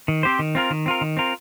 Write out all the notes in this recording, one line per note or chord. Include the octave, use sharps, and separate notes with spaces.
D#3
C4 G4 C5
D#3
C4 F4 A#4
D#3
C4 F4 A#4
D#3
C4 F4 A#4